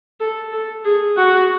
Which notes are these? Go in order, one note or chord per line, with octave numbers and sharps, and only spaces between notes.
A4
A4
G#4
F#4